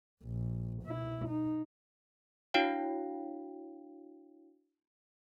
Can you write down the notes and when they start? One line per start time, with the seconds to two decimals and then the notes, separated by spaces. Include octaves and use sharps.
0.23 A#1
0.83 B2 E4
1.29 D#4
2.54 D4 E4 F#4 C#5 F5 G5